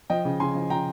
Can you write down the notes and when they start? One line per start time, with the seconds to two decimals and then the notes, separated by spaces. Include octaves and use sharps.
0.10 F3 D#5 G5
0.25 C#3
0.40 C#3 G#5 C6
0.55 F3
0.70 F3 G5 A#5